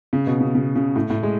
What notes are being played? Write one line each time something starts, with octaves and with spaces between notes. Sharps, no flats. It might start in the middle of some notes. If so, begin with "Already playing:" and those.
C#3
B2
C#3
C#3
C#3
A2
A2
G#3